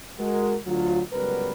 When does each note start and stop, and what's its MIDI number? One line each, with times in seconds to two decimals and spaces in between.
0.19 0.55 56
0.19 0.55 66
0.19 0.55 70
0.66 1.01 38
0.66 1.01 54
0.66 1.01 65
1.13 1.52 37
1.13 1.52 54
1.13 1.52 55
1.13 1.52 59
1.13 1.52 70
1.13 1.52 71